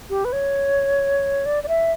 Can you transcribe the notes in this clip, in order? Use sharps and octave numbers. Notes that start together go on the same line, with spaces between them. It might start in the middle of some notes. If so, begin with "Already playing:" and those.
G4
B4
C#5
D5
D5
E5